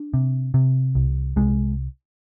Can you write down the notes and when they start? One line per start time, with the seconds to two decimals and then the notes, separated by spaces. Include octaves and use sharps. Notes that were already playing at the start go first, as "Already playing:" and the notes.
Already playing: D4
0.14 C3
0.54 C3
0.95 C2
1.36 C2 G#3